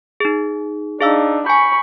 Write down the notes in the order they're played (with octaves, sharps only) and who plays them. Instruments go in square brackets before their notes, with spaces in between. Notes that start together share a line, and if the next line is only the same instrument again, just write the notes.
[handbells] D#4 G#4
[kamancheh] D4 D#4 [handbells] G#4 F5 E6
[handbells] G#5 G6 [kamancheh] B5 C#6